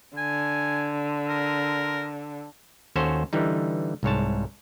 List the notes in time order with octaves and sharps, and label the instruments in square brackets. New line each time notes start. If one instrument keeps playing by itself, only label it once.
[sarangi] D3 [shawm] G#5
[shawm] A#4
[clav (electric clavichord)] D#2 C#4 F#4 A4 C5
D3 E3 G3 D#4
C2 G#2 C#5 A5